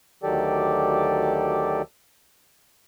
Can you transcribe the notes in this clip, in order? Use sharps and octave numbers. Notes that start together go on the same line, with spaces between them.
D2 D#3 F#3 G4 A4 D5